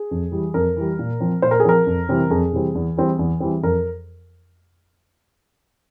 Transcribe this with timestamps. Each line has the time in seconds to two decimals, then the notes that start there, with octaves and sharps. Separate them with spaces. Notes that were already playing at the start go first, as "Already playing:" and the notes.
Already playing: G#4
0.11 F2
0.32 E3 G3
0.54 F2 A#4
0.76 E3 G3
0.99 A#2
1.20 F3 C4
1.42 A#2 C5
1.51 A#4
1.60 G#4
1.65 F3 C4 A#4
1.86 F2
2.09 C3 E3 G3 C4
2.30 F2 G#4
2.53 C3 E3 G3 C4
2.75 E2
2.97 E3 G3 C4
3.19 E2
3.40 E3 G3 C4
3.63 F2 A#4